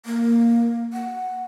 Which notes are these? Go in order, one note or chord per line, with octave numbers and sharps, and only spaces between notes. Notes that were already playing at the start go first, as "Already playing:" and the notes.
A#3
F#5